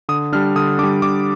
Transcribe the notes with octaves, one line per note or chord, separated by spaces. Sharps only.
D3 D#6
G3 D4 F6
D3 D#6
G3 D4 D6
D3 D6